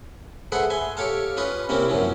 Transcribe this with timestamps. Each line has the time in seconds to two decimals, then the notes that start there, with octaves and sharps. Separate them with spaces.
0.52 G#4 A4 B4 C5 E5 F#5
0.70 E5 G#5 C6
0.97 G4 A4 C#5 F5 A5
1.37 C#4 F4 B4 D#5
1.69 C3 A#3 C4 C#4 E4
1.88 F#2 E3 F3 C#4